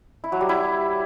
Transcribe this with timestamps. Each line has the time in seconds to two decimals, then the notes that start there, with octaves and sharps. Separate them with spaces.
0.24 E4
0.32 F#3
0.41 G3
0.49 E4